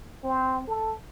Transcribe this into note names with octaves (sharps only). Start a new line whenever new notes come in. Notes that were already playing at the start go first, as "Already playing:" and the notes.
C4
A4